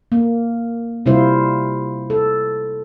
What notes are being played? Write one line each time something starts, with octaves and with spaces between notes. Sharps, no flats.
A#3
C3 G3 E4 F4 C5
A4